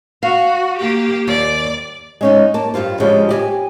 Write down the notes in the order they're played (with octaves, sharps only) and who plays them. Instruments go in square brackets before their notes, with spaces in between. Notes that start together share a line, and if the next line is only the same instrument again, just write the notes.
[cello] F#4 [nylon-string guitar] F5
[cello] A#3 G4
[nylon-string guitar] D#2 [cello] D5
[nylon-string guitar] G#3 C#4 D#4
A#3 A5
G2 G3 F4 C5
C#3 F3 G3 G#3 D4
G4 D5 G#5